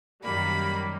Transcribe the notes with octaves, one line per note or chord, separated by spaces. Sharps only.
F#2 D#3 G3 A#3 B5